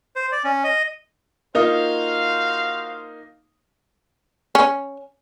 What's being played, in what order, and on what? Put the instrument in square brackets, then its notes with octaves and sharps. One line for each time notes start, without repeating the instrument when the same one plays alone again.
[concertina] C5
D5
C#4
D#5
[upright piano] A#3 D#4 F4 [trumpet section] F#4 C5 F5
[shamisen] C#4